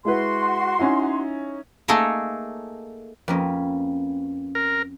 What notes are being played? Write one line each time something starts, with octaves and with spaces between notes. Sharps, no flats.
G#3 E4 F#4 B4 C6
C#4 D#4 E4
A3 A#3 D#4 G#4 A4
F2 A#3 C4 C#4 B4 D#5
A#4